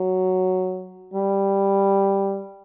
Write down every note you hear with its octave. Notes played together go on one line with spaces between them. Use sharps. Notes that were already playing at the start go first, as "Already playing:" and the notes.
Already playing: F#3
G3